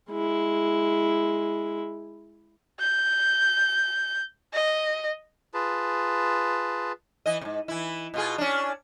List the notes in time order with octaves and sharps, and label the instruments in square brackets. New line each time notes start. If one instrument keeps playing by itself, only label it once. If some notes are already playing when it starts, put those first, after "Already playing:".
[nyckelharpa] G#3 E4
[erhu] G6
D#5
[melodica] F4 G#4 B4 A5
[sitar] E3 D#5
G#2 C3
E3 E4
B2 F4 G#4
C#4 D4